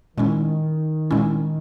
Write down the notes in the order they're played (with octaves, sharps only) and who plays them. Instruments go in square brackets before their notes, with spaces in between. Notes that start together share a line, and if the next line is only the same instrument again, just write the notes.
[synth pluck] A#2 G#3 C#4 E4 [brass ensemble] D#3
[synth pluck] A#2 G#3 C#4 E4